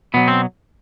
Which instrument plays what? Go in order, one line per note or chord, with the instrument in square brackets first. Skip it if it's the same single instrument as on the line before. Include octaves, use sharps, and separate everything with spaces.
[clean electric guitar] B2 F#3 B3
C4